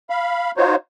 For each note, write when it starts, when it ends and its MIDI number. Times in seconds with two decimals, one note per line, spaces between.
0.10 0.51 77
0.10 0.51 83
0.57 0.76 63
0.57 0.76 65
0.57 0.76 66
0.57 0.76 72
0.57 0.76 73